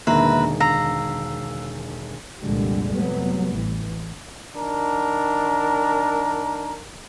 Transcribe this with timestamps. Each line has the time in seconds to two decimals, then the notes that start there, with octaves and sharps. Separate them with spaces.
0.07 E1 D3 D#3 A#3 B4 E5 A#5
0.60 F5 A#5 E6 C7
2.41 C2 F2 A#2 D3 G3 G#3
2.95 F2 C3 F#3 G3 A3 B3
3.51 A1 E3
4.56 D#3 D4 A#4